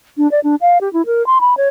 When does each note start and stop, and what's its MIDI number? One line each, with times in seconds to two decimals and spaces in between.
0.17 0.30 62
0.31 0.40 74
0.44 0.55 62
0.61 0.78 77
0.81 0.91 67
0.93 1.05 64
1.06 1.25 70
1.27 1.39 84
1.41 1.56 83
1.57 1.69 73